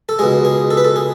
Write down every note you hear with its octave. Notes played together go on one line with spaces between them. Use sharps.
A4
C#2 B2 G#3 G#4
G#4
A4
B4
A4
G#4